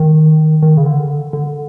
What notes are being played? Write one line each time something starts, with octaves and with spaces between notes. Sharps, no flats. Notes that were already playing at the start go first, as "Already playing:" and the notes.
Already playing: D#3
D#3
C#3
D3
D3